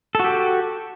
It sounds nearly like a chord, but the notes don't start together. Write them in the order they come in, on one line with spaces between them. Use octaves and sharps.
A4 F#4 G4